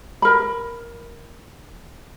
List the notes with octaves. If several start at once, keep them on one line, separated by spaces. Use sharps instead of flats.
A#4 B5